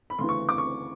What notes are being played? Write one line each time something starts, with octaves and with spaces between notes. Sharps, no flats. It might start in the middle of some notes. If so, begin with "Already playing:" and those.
B5
D2 C#3 E3 C6
C#6
D6
C#6